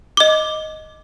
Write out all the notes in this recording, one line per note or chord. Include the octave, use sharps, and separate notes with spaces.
D#5 D6